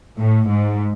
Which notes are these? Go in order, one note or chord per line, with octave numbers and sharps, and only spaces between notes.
A2
G#2